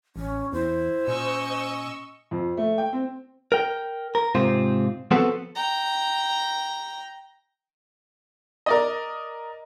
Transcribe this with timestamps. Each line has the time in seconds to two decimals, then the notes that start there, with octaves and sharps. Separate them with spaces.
0.16 A1 C#4
0.53 E2 E4 C5
1.07 A#2 C#4 D#5 C#6 E6
2.31 F2
2.57 A3
2.78 G5
2.93 C4
3.52 A#4 G5
4.15 A#4
4.35 G#2 C3 C4 F4 C5
5.11 F3 B3 C4 F#4 A4 B4
5.55 G5 A#5
8.66 A#4 D5 D#5